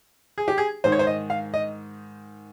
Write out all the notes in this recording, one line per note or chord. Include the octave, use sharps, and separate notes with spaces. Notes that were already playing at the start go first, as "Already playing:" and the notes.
G#4
G4
G#4
G#2 D#3 C5
C#5
C5
D#5
F5
D#5